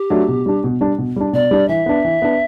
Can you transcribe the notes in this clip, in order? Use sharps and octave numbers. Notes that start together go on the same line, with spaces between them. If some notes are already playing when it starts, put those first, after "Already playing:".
Already playing: G4
F#3 A3 D4
B2
G3 D4
B2
G3 D4
B2
G3 D4
B2 D5
G3 D4
E3 E5
B3 D4
E3
B3 D4